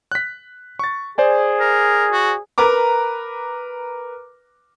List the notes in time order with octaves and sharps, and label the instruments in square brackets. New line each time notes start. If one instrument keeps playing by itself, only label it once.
[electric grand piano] F#6 B6
C#6 A6
[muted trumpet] G#4 [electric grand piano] C5 D5 G#5
[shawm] A#4
F#4
[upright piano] A#4 B4 A#5 D6